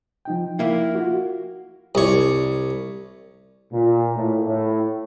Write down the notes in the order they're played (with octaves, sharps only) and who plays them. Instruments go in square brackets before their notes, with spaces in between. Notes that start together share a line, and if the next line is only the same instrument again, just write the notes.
[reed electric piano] F3 D#4 G5
[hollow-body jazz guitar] A#3 E4
[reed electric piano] F4 F#4
[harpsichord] C2 C#5
[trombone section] A#2
A2
A2